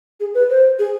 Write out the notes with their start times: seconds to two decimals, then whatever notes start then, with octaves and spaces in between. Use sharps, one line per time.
0.20 G#4
0.35 B4
0.50 C5
0.79 G#4